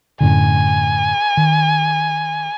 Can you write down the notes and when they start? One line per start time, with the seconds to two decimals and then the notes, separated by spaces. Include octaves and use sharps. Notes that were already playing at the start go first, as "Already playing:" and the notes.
0.21 F#2 A2 D3 G#5
1.37 D#3